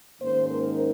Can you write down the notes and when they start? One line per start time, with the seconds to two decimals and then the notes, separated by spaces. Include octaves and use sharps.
0.20 G#2 D#3 A#3 C#4 C5
0.49 A#4